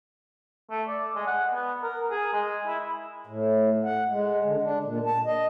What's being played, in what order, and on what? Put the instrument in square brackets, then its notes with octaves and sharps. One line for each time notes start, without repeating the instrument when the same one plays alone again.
[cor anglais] A3
D5
G#3
F#5
B3
A#4
G#4
G#3
E4
[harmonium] A2
F#5
G#3
D3
D4
A#2
A5
D#5